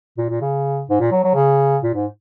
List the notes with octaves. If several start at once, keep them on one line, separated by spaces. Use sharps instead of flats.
A#2
A#2
C#3
G#2
A#2
F#3
F#3
C#3
A#2
G#2